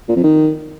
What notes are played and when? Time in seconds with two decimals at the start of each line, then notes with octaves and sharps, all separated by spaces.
0.08 A#2
0.16 F2
0.24 D#3